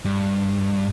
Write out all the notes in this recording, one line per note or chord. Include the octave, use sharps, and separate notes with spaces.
G2